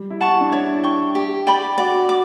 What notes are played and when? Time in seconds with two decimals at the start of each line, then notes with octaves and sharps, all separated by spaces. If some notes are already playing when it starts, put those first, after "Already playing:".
Already playing: G3
0.10 E4
0.20 F#5 A5 C#6
0.41 D4
0.52 E4 C#5
0.83 G5 C#6
1.15 G4
1.47 D5 G5 B5
1.78 F#4 D5
2.09 D6